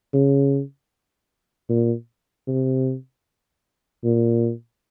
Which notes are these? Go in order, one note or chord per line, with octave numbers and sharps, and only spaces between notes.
C#3
A#2
C3
A#2